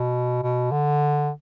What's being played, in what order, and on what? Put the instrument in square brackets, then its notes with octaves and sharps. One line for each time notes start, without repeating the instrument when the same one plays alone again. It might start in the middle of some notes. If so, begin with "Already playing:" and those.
Already playing: [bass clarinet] B2
B2
D3